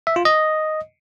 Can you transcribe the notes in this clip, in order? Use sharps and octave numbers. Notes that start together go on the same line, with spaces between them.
E5
F4
D#5